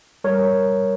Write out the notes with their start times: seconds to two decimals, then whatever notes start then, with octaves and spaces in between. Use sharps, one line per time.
0.24 G3 A#4 C#5